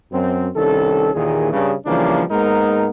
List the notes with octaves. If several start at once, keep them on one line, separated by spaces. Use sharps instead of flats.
F#2 C4
C2 D#3 C#4 A4
D#2 A#2 D#3 E3 G#4
G2 C#3
C#3 E3 F3 G3 A#3 D4
G#2 G#3 A#3 B3 D#4 A#4